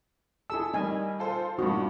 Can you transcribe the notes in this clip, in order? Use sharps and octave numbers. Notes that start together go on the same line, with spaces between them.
E4 G#4 A4 E6
D#3 G3 D#5 G#5
F4 A4 C5
G2 A#2 D#3 F#4